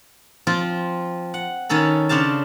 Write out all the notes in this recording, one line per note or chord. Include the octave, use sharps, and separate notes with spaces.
F3 C4 F4
F#5
D#3 C#4 A4 B5
C#3 D4 C5 F5 A5